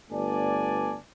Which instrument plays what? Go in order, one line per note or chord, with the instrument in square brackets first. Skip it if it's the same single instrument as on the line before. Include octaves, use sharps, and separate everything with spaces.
[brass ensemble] G1 A3 B3 D4 D5 G#5